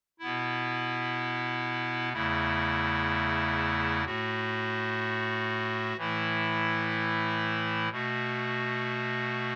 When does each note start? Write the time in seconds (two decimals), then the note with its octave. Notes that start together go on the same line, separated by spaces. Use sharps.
0.19 B2 B3 E4
2.12 E2 C#3 A3 E4
4.04 A2 A3 F#4
5.97 A2 E3 A3 E4
7.90 B2 A3 F#4